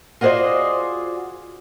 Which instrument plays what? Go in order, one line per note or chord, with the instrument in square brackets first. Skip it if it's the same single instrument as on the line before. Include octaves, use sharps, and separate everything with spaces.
[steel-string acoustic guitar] F4 F#4 G#4 C5 D5 D#5